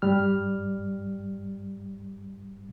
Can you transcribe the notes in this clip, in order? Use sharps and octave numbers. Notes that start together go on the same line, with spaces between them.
G2 G3 F6